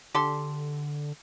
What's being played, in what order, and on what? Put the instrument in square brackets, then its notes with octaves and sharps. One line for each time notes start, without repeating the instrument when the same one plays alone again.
[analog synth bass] D3 [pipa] G4 A4 C6